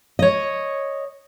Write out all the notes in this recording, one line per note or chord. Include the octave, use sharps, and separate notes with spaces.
C#5 D#5